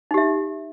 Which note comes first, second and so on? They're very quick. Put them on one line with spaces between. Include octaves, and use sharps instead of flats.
D#4 G4 E5